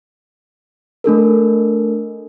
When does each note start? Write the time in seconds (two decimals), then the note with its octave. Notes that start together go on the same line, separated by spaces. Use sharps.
1.04 A3 D4 A4 A#4